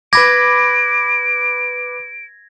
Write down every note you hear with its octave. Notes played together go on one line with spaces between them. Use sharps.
B4 B5 D6 G#6 A#6 D7